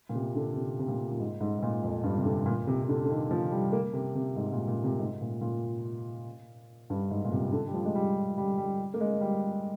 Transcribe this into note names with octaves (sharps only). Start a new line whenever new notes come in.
A#2
C3
D3
C3
C3
A#2
A#2
G#2
G#2
G#2
A#2
F2
G2
C3
D3
A#2
C3
C3
D3
D3
D#3
F3
G3
A#3
C3
C3
G#2
A#2
A#2
C3
A#2
G#2
A#2
A#2
G2
G#2
A#2
C3
D3
G3
F3
G#3
G3
G3
G3
A#3
G#3
G3